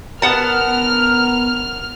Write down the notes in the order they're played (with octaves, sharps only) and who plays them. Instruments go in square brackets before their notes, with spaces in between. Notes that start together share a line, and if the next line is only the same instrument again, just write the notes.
[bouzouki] B3 F#5 A5 [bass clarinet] A#4 [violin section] F6